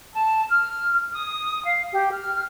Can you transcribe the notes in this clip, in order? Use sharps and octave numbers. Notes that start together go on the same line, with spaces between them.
A5
F6
D#6
F5
G4
F6